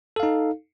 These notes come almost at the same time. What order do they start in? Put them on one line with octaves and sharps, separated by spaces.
A4 F5 D#4